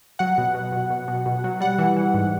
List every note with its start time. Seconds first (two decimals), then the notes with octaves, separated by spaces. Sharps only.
0.19 F#3 F#5
0.38 B2
0.55 B2
0.72 B2
0.90 B2
1.08 B2
1.26 B2
1.44 F#3
1.61 G3 F#5
1.78 E3
1.96 E3
2.14 G#2